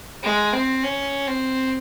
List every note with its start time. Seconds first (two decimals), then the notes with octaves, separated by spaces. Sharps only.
0.23 G#3
0.53 C4
0.84 C#4
1.28 C4